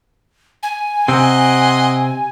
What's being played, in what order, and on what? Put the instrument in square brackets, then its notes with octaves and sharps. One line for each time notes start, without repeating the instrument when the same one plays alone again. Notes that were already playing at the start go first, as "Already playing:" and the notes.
[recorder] G#5
[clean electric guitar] C3 C4 [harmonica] D#5 F#5 C6